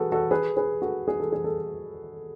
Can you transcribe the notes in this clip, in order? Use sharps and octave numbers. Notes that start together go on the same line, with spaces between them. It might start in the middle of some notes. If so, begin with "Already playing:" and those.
Already playing: F#4 G#4 A4 B4
F#4 A4
G#4 B4
G#4 B4
F#4 A4
G#4
A4
G#4
A4